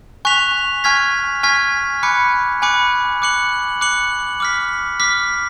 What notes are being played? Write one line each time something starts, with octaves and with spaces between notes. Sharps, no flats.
G#5 C#6 F#6 B6 F7
G#5 C#6 F6 G#6 B6
G#5 C#6 F6 G#6 B6
G#5 B5 D6 F#6 C#7
G#5 B5 D6 F#6 C#7
D6 F#6 C#7 F#7
D6 F#6 C#7 F#7
D6 F6 B6
D6 F6 B6